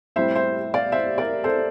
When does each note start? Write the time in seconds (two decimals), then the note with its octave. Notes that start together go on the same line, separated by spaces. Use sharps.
0.16 A2 G3 C4 C5 E5
0.35 C5 E5
0.74 D5 F5
0.92 C5 E5
1.18 A#4 D5
1.44 A4 C5